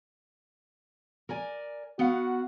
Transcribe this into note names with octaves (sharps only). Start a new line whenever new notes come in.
A#4 D5 G#5
B3 F#4 F5 F#5